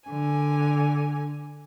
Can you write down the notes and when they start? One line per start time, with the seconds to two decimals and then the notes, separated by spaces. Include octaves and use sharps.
0.10 D3 G#5